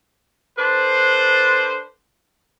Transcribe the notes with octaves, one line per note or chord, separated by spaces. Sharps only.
D4 A4 B4 C5